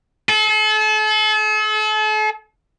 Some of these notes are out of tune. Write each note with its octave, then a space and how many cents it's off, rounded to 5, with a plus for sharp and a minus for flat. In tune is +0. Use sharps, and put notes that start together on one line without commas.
A4 -40